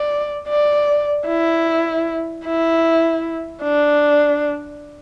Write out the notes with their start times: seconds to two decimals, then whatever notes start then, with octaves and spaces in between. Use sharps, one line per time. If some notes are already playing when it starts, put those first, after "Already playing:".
Already playing: D5
0.49 D5
1.27 E4
2.45 E4
3.63 D4